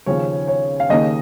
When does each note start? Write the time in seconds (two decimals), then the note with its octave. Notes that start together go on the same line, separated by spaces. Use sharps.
0.06 D#2 C#3 F3 C#4 C#5
0.48 C#5
0.80 F5
0.89 D#2 C#3 A#3 D#4 D#5